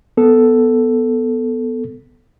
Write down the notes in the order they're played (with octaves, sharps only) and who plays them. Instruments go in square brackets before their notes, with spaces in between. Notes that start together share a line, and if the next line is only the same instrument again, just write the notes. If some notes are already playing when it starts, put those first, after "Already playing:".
[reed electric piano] B3 A4